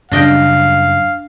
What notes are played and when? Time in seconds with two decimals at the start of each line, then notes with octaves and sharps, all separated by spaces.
0.12 F#2 C#3 G3 D4 D#5 F5 G5